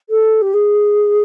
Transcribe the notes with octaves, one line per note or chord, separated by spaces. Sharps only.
A4
G4
G#4